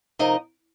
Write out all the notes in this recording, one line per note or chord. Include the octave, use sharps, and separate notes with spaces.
C3 F3 D#4 A#4 D#5